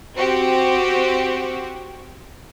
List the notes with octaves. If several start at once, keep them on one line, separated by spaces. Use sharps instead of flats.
C4 F#4 G4